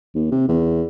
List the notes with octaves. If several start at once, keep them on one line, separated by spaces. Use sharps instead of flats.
D#2
C3
E2